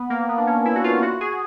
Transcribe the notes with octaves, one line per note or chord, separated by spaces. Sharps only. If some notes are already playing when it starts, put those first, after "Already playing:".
Already playing: B3
A#3
B3
D4
C#4
E4
F#4
F4
F#4
G#4